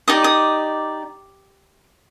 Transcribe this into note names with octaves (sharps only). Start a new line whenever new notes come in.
D#4 G4 D5 D#6
D#6